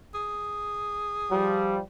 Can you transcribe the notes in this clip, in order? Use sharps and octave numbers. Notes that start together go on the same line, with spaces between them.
G#4
F3 G3